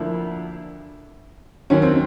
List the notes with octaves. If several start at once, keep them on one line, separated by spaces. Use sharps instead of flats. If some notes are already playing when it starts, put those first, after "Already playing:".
Already playing: D2 D3 F3 A#3 D4 E4
D#2 D#3 F#3 C#4
C4